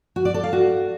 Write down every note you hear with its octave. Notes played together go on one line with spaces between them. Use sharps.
F#4
D5
A4
F5
F#4